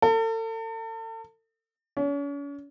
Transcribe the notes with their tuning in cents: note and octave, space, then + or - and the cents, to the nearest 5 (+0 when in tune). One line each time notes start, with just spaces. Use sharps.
A4 +40
C#4 +40